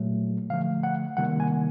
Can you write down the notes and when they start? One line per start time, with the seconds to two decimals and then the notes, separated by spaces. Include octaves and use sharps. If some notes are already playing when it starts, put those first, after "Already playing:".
Already playing: A#2 F#3 A3
0.50 D3 F3 A3 F5
0.83 F#5
1.17 C3 D#3 G3 A#3 F#5
1.40 G#5